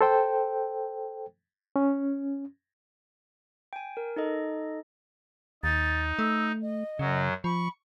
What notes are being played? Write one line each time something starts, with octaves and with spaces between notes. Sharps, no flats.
A4 C5 G5
C#4
G5 G#5
A#4
D#4 A4 D#5
D#2 D#4 A6
A3 E6
D#5
F#2 C#3 F#3
F3 B5 C#6